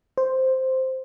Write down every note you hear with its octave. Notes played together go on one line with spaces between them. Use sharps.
C5